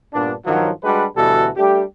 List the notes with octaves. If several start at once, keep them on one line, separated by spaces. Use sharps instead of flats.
G2 A#2 B3 D4
G2 D#3 F3 F#3
G3 G#3 D4 F#4 G4 B4
D2 B2 E3 G3 F#4 A4
G3 A3 D4 G4